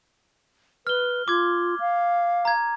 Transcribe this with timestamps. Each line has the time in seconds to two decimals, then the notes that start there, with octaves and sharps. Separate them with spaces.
0.87 B4 F6 G7
1.28 F4 D6 G#6
1.80 F5
2.45 A#5 G#6